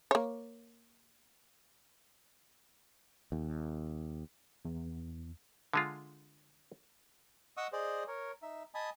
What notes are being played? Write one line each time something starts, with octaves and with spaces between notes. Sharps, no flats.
A#3 C#5
D#2
E2
D3 G#3 F4
D#5 F#5 C#6 D#6 E6
G#4 C5 D5 D#5
A#4 C#5
D#4 E5
D#5 G#5 A5 B5 D#6